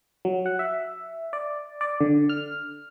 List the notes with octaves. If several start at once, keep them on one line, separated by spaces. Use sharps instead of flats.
F#3
F#5
E5
D5
D5
D3
F6